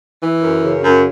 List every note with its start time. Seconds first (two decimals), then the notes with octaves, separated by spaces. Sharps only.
0.20 E3
0.42 F#2
0.63 C#3
0.84 F#2